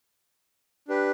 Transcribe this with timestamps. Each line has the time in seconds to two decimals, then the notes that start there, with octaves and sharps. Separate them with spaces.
0.88 D4 G4 B4